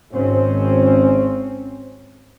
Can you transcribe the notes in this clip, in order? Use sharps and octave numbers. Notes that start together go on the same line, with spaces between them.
G#1 C4 C#4